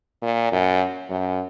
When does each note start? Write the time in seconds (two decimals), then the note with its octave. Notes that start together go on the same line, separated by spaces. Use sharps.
0.22 A#2
0.52 F#2
1.10 F#2